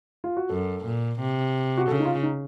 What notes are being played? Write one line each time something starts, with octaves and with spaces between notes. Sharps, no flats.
F4
F#4
F#2 A4
A#2
C3
F#4
C#3 A4
D#4
F4
D#4